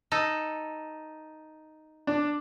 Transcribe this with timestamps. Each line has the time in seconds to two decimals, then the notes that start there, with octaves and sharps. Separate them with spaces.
0.12 D#4 A4
2.07 D4